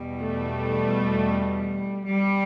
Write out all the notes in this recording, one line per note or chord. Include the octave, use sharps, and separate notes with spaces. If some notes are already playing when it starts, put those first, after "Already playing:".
Already playing: E2 B2 G3
A3
G3